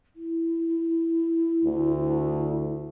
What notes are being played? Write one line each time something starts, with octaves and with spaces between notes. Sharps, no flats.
E4
D2